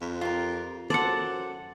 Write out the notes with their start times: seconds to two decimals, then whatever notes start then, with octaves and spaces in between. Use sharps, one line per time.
0.01 F2
0.21 F4 G4 A#4
0.90 F#2 A4 C5 D5 F#5